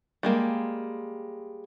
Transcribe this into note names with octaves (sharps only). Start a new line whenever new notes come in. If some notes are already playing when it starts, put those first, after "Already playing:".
G3 G#3 A#3